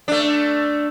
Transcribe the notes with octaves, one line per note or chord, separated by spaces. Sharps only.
A3 D4